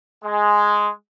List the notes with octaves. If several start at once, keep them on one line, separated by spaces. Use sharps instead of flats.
G#3